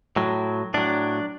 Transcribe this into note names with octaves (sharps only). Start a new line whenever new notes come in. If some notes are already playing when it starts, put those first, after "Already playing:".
A2 F#3
A2 F#3 D4